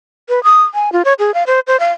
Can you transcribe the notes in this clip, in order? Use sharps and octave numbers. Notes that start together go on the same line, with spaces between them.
B4
D#6
G#5
F4
C#5
G#4
F5
C5
C5
F5